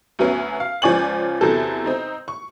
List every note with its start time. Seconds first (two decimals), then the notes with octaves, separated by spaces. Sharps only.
0.19 D2 F#3 B3 C#4
0.60 F5
0.82 C#2 F3 C#4 D5 G#5 F#7
1.41 E2 C3 F#3 A4
1.86 C4 D#4
2.28 C#6